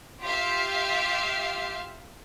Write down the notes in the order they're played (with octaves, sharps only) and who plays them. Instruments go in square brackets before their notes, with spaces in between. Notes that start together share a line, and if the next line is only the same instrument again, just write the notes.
[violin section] F4 G4 E5 F5